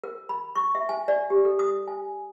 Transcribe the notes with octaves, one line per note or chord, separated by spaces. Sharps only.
A#4
B5
C#6
E5
G#5
D5
G4
A4
D#6
G#5